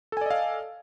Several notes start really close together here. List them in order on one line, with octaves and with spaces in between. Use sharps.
A4 G#5 D5 D#5 F5